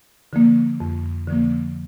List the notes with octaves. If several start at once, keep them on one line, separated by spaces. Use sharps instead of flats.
D3 F3 A#3
F2
D3 F3 A#3